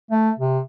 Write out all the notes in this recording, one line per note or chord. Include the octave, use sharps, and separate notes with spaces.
A3
C3